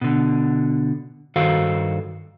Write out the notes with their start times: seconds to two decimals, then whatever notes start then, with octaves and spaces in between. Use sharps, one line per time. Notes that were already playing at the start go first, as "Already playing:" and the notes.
0.01 B2 D3
1.36 G2 D#3 F#4 A4 C5 F5